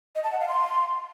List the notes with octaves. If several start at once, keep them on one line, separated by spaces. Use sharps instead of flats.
D#5
A5
F#5
F5
C6